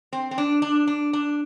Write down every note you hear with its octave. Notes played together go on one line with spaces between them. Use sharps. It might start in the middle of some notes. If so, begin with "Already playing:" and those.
C4
C4
D4
D4
D4
D4